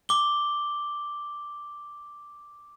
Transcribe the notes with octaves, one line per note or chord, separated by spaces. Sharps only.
D6 G7